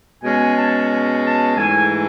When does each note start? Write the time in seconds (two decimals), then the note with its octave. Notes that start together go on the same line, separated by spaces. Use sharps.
0.22 B2 G#3 C#4 G#5
0.55 A5
0.88 A5
1.22 A5
1.56 G#2 E3 A3 G#5